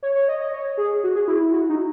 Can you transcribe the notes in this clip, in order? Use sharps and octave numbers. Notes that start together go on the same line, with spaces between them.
C#5
C#5
D#5
D#5
C#5
G#4
F#4
G#4
E4
E4
F#4
D#4